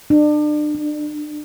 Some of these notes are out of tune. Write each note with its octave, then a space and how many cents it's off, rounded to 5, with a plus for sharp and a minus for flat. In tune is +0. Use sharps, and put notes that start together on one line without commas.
D4 +35
D4 +0